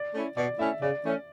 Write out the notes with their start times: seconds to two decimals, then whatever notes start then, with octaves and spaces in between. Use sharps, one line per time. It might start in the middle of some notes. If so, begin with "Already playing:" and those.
Already playing: D5
0.14 A3 C#4 E4
0.37 B2 D5
0.59 A3 C#4 E4 E5
0.82 C#3 D5
1.04 E3 A3 C#4